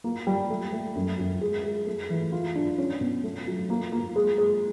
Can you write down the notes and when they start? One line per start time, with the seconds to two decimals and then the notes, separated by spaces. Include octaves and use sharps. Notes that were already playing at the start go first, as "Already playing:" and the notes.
0.04 A#3
0.27 G3
0.50 A3
0.72 A3
0.96 F#2
1.19 F#2
1.41 G#3
1.65 G#3
1.87 A3
2.10 E3
2.32 F4
2.56 D4
2.78 C#4
3.01 B2
3.24 A3
3.47 F#3
3.70 A#3
3.92 A#3
4.16 G#3
4.38 G#3